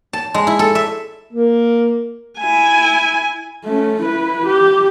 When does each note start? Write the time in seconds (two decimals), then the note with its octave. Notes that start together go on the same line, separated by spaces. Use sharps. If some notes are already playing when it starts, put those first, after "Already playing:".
0.13 A5
0.34 G#3
0.47 E4
0.59 A4
0.75 E5
1.33 A#3
2.39 E4 G#5
3.65 A3 C#4
4.02 E4 B4
4.46 G4